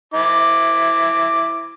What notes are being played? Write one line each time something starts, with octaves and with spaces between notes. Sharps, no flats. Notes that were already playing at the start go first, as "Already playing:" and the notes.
E4 D6